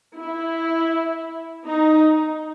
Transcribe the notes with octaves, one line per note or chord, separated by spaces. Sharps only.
E4
D#4